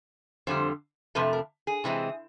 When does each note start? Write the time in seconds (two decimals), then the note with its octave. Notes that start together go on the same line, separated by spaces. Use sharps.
0.47 F2 D3 G3 C5
1.15 F2 C3 F3 A3 B4
1.33 A#4
1.67 G#4
1.84 C3 E3 G#3 C4